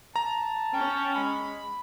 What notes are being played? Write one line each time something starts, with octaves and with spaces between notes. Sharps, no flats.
A5 A#5
C#4 G5
G#3 B5